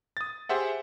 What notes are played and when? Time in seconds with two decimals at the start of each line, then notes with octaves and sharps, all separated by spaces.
0.17 D#6 A6
0.49 G4 G#4 C5 E5 F#5